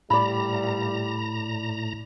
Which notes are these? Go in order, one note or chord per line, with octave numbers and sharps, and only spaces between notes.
A2 G3 D5 A#5 B5